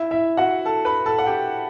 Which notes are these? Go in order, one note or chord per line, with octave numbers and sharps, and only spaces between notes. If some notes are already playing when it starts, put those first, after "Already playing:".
Already playing: E4 E5
E4 E5
F#4 F#5
A4 A5
B4 B5
A4 A5
F#5
G4 G5